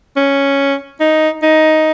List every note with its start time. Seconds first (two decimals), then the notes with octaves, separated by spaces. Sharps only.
0.16 C#4
1.00 D#4
1.42 D#4